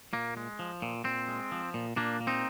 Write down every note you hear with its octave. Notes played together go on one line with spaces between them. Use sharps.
A#2 A#3
G#3
F3
A#2
A#2 C4
G#3
F3
A#2
A#2 A#3 D4
A#3
C4 D#4